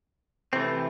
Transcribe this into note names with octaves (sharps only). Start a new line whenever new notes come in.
C3 E3 A3 C4